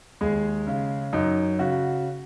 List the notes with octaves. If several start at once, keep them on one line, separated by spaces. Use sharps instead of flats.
D#2 G#3 G#4
C#3
F#2 D#4
C#3 F#4